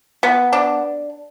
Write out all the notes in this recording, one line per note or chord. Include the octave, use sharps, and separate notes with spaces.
B3
D4